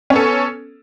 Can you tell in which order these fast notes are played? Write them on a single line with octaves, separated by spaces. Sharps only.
C#4 B3 A4